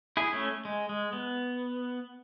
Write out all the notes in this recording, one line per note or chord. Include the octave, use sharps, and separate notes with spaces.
E4 G#4
A3 C#4
G#3
G#3
B3